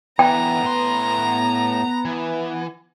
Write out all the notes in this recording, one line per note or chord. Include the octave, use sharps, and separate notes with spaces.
D3 E3 B3 G5 A#5
A2 C6
E3